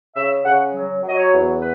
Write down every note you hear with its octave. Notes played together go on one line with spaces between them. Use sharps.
C#3 E5
C#3 F#5
F#3
F#3 D#5
C#5
E2
B4